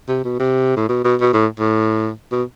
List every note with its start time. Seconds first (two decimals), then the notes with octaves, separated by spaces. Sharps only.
0.09 C3
0.24 B2
0.39 C3
0.77 A2
0.89 B2
1.04 B2
1.20 B2
1.33 A2
1.59 A2
2.32 B2